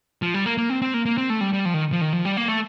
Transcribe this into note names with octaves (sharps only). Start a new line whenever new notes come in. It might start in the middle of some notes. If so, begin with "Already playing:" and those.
F3
G3
A#3
A#3
C4
C4
A#3
A#3
C4
A3
G3
G3
F3
D#3
F3
D#3
F3
G3
A#3
A3